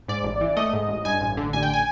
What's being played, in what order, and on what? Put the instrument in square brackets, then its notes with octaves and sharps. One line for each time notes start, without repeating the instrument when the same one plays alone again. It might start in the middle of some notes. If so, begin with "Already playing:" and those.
[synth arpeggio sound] G#2 D5
A1
E3
A3 D#5
G#2
A1
G2 G#5
A1
D3
A1 G#5
G5
G#5